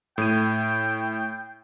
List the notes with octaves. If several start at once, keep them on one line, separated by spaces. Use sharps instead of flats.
A2 G5 D#7